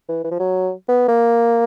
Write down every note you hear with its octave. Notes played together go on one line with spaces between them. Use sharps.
E3
E3
F3
F#3
B3
A#3